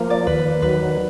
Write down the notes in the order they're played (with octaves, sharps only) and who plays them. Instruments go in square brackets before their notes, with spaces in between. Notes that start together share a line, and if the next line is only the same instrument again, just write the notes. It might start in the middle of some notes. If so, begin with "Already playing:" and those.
Already playing: [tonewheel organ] F3 A#3 [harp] A#4
[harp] D5
[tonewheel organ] D#2 [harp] B4
[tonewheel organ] D#3 F#3 [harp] B4